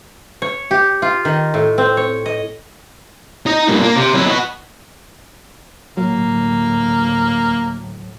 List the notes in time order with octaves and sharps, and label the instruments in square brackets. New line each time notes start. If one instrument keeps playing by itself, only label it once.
[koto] C#5
G4
F4
D#3
A2
C4
C#5
D#5
[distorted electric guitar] D#4 D#5
G2 A#2
A#3
C3
F#3 E4
B3 F#4
[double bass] D2 A2 [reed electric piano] F#3 [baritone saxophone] A#3